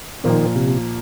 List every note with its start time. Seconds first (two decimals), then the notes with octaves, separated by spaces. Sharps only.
0.24 A#2 D#3 F3 A#3
0.56 C3